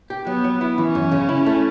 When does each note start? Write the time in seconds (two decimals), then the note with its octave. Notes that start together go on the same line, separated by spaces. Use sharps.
0.10 G4
0.27 F#3 B3
0.44 F#3
0.61 E4
0.77 E3 C#4
0.95 F#2
1.12 C#3
1.29 E4
1.46 A3